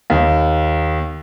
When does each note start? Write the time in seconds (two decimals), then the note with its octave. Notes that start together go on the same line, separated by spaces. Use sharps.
0.10 D#2